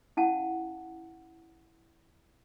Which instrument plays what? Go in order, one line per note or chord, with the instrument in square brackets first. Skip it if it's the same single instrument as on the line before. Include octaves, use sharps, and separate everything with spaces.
[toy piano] C#4 E4 F5 F#5 A5